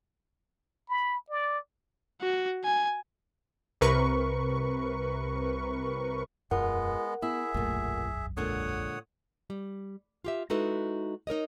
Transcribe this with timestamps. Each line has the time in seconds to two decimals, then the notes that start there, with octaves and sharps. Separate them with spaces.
0.88 B5
1.30 D5
2.21 F#4
2.64 G#5
3.81 C2 C3 A#4 B4 C#6
6.51 E1 F#2 G#3 B3 F4 A#4 F#5
7.22 B3 E4 G#4 E5
7.54 E1 B1 F#2 A#2 A3
8.37 A#2 D3 G#3 C#5 F#5 D#6
9.50 G3
10.24 F4 G4 E5
10.50 G#3 D#4 E4 F#4 A4 B4
11.27 D#4 A#4 C#5 D#5